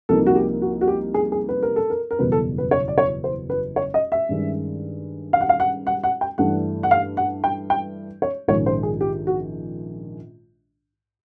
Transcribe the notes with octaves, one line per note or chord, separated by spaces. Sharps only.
C2 C3 F3 A#3 D#4 A4
F#4
G4
F#4
F#4
G4
G#4
G#4
B4
A#4
A4
A#4
A#4
F#1 E2 B2 G3 B4
A4
B4
C#5
D5
C#5
C5
B4
C#5
D#5
E5
G2 D#3 G#3 C#4
F5
F#5
F5
F#5
F#5
F#5
G5
G2 E3 A3 D4 F#5
F#5
F5
F#5
G5
G5
C#5
A#1 G#2 D#3 G#3 C#4 C#5
C5
G#4
G4
F#4